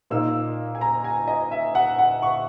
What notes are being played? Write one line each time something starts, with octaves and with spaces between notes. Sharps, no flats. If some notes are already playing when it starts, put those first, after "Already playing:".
A#2 A#3 D#4 E6
G#5
A#5
G#5
D#5
E5
F#5
F#5
C#6